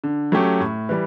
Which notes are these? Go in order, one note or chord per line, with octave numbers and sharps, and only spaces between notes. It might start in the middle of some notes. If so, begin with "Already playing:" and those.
D3
F#3 A3 C#4 G4
A2
E3 G3